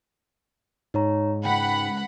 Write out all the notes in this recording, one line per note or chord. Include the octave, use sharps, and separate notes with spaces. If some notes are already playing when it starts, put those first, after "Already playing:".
G#2 D#4 C#5 A#5
C#2 F#5 G5 B5